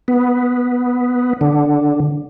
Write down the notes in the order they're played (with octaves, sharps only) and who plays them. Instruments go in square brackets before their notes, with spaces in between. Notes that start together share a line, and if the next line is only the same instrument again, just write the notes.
[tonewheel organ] B3
D3